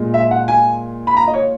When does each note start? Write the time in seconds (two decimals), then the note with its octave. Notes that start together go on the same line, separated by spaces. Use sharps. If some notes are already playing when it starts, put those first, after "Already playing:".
Already playing: A#2 G#3
0.14 E5
0.31 F#5
0.48 G#5
1.07 B5
1.17 A#5
1.27 D#5
1.34 C#5